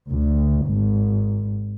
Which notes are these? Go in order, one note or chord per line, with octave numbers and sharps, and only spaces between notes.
D2
G#1